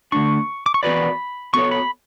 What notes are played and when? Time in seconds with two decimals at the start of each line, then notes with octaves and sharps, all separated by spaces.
0.12 D3 A3 D4 C#6
0.66 D6
0.74 C#6
0.83 E3 B3 F#4 B4 D5 B5
1.54 B3 F#4 A4 C#5 C#6
1.71 B5